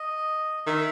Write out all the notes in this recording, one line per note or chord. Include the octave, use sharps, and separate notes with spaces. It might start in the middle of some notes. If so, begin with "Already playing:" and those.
Already playing: D#5
D#3 E5